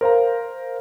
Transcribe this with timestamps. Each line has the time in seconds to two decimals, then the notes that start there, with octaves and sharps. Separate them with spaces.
0.01 A#4 C5 F5 A#5